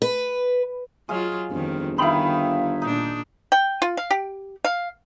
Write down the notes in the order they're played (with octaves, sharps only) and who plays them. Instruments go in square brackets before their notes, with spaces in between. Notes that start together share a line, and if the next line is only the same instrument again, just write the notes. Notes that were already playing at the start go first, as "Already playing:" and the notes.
[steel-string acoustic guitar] B4
[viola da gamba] F#3 F4 [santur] G#3 F5
[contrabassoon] G1 [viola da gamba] F2 D#3
[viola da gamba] D#3 [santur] D#4 E4 [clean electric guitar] F5 G5 B5
[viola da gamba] A#2 D4 [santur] D#4
[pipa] G5
F4
F5
G4
F5